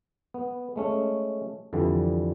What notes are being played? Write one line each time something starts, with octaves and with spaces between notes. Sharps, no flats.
B3
G#3 A3 C#4
F2 D3 E3 G3